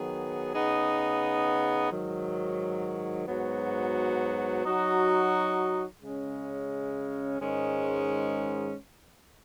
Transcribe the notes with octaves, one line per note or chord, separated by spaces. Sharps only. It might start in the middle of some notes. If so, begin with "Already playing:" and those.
Already playing: D#3 F#3 B3 G#4
C#3 B3 D#4 G#4
G#2 D#3 F#3
G#2 F#3 B3 F#4
F#3 D#4 F#4
C#3 G#3 C#4
G#2 D#3 G#3 C#4